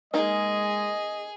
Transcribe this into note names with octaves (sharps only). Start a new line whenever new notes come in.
G#3 A#3 D#4 G#4 D#5